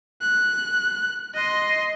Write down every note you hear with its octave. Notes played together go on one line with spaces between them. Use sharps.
F#6
D#5 C6